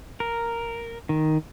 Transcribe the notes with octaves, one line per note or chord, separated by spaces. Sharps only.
A#4
D#3